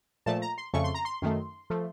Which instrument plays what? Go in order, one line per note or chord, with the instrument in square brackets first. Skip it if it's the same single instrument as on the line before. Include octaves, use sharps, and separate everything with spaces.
[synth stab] A#2 F3 A3 A5
A#5
C6
F2 C#3 A3 C#6
C6
A#5
C6
F#2 D#3 A3
F3 A3